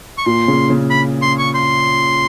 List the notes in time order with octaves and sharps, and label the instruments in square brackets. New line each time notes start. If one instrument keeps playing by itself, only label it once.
[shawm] C#6
[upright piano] A#2 [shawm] C6
[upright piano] C#3
C#3
[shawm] B5
C6
C#6
C6